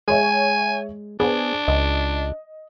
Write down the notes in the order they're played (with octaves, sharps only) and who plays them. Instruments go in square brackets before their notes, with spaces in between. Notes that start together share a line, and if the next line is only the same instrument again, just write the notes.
[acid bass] G#3 [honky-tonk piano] G#4 C#5 E5 [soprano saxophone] G#5
[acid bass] B3 [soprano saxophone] D4 [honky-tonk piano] G#4 C5
[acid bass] C#2 [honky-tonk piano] D#5